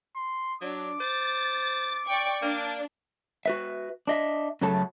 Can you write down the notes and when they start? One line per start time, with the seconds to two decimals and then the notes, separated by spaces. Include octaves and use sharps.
0.16 C6
0.61 F#3 D4 D6
1.00 C5 A6
2.07 D5 G5 C#6
2.42 A#3 D4
3.46 F#4 B4 E5
4.07 D4 D#5 E5
4.61 F#2 C#3 F#3 A3 A4 A5